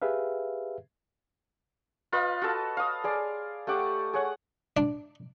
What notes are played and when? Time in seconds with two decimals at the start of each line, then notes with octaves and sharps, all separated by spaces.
0.02 G4 G#4 B4 E5 F5
2.12 F4 B4 D#5 F5
2.42 F#4 A4 A5
2.77 F5 D#6
3.04 G#4 D5 C6
3.67 A3 G4 F#5 D6
4.13 G#4 C#5 F#5
4.77 D4